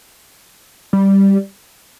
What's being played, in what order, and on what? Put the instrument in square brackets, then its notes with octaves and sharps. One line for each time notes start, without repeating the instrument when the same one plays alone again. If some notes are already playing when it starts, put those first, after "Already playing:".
[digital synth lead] G3